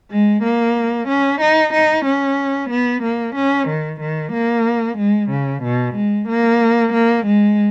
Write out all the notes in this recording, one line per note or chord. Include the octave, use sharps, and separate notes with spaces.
G#3
A#3
C#4
D#4
D#4
C#4
B3
A#3
C#4
D#3
D#3
A#3
G#3
C#3
B2
G#3
A#3
A#3
G#3